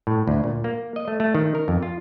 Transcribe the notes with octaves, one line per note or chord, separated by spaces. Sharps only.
A2
D2
A#2
A#3
D#5
A3
A3
D#3
A#4
F2
F4